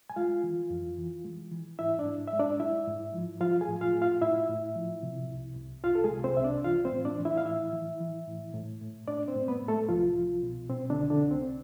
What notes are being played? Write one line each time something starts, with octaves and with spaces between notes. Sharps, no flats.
G#5
G#3 F4 F5
E3
F2
E3
G#3
E3
G#2 E4 E5
D4 D5
G#2
E5
G#3
D4 D5
G#3 E4 E5
G#2
F3
F3 F4 F5
G#4 G#5
A2
F4 F5
A2
F4 F5
A2 E4 E5
A2
F3
C3
C2
C2
C2 F4 F5
A4
G#3 G#4
C3
C4 C5
C2 E5
D4 D5
E3 F4 F5
C4 C5
A2
D4 D5
E3
E4 E5
F5
A2 E4 E5
E3
E3
A2
A2
A2
A2 D4 D5
C4 C5
A2
B3 B4
A2
A3 A4
C2 F3 F4
C2
B2
B2 C4
D3 D4
C2
D3 D4
C2
C4